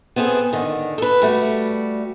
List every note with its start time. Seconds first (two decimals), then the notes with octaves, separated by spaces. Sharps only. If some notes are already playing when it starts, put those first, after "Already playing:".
0.16 B3 C4 E4 G#4 A4
0.53 D3 D#3
0.98 A4 B4
1.22 G3 A3 F#4